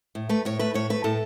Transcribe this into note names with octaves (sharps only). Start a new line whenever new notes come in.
A2
A3 B4
A2 C#5
A3 B4
A2 C#5
A3 B4
A2 A4